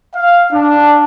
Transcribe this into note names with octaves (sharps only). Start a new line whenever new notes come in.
F5
D4